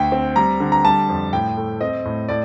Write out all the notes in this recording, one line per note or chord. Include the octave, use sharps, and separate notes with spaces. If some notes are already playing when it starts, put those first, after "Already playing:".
Already playing: D2 G5
C4
G3 A#5
D3
A#5
G3 A5
F2
A2 G5
A3
C4 D#5
A2
A2 D5